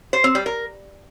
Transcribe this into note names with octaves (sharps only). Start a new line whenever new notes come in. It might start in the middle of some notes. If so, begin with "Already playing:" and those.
C5
C4
G3
A#4